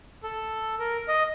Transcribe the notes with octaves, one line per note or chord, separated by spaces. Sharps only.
A4
A#4
D#5